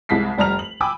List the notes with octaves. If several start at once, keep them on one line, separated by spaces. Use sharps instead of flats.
C2 G#3 E4 A5 B6 C7
F1 G3 A5 A#5 F6 F7
F#7
G5 G#5 B5 D6 E6